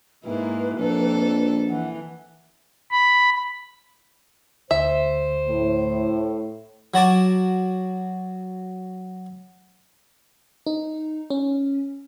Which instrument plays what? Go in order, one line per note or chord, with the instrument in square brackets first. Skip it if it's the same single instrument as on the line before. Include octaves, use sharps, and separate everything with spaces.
[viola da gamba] G#2 A#3 E4 [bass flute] B4
[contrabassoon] A#1 [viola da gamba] F2 A#3 A4
[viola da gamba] E3 [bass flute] F#5
[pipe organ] B5
[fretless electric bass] D2 [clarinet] C5 [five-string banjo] E5
[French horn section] A2
[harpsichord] F#3 F#4 A5 D6
[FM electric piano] D#4
C#4